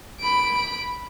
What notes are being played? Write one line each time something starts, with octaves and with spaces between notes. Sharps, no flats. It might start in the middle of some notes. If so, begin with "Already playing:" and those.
B5 D7